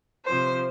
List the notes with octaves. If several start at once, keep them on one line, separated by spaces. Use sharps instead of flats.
C3 F3 C5